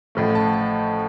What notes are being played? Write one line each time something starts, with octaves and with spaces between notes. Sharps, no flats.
A1 A2 F3 A3
A5